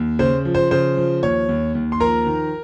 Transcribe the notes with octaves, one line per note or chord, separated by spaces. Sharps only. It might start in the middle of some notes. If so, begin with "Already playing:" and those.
Already playing: D#2
C#3 C5
F3
C5
C#3 C5
F3
D#2 C#5
D#2
D#2
C6
F3 A#4 A#5
D#3